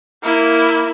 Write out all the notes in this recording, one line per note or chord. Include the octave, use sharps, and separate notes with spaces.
A#3 E4